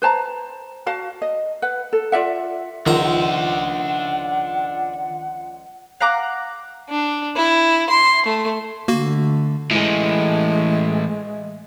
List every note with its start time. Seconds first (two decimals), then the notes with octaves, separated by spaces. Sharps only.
0.02 B4 C5 A5 A#5
0.86 F#4 F5 A5
1.22 D#5
1.62 B4 F#5
1.93 A4
2.12 F4 D5 E5 F#5
2.86 C#2 D#3 F3 D4 E5 F#5 A#5
6.01 F5 F#5 A#5 D6
6.90 D4
7.36 E4
7.90 C6
8.26 A3
8.88 D3 A3 A#3 F#4
9.71 A2 E3 G#3